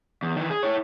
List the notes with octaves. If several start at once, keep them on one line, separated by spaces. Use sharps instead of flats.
E2
D#3 E3
G#4
E4 C#5